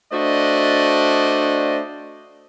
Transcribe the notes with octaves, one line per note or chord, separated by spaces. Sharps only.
A3 D4 F#4 C5 D5 D#5